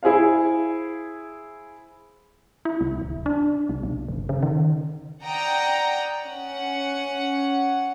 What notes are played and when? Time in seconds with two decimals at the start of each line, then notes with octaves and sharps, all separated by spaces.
0.03 E4 G#4 C5 F5
2.65 E4
2.81 C2
3.02 D1
3.26 D4
3.69 C2
3.83 B1
4.09 F#1
4.29 C#3
4.43 D#3
5.23 D5 F#5 G5 A#5 D#6
6.26 C#4 F#5